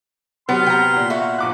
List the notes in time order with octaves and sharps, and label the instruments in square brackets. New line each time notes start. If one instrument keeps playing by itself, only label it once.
[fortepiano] C3 F#3 B4 [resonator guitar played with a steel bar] B3 [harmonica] C6 F6
[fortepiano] C3 [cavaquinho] G5 A#5
[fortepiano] A#2
[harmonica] F#4 [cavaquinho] E5 F5 C#6
[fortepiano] A#1 D6 F#6